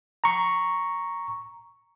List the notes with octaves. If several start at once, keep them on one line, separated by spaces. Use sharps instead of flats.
A#5 C#6